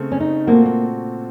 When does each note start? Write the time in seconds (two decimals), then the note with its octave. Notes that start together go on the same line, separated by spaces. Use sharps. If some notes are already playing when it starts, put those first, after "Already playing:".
Already playing: C#3 A3 C4
0.12 C#4
0.20 D#4
0.47 A#2 A3 A#3 C4 F#4
0.65 A#3